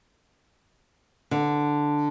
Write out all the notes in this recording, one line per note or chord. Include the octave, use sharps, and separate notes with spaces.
D3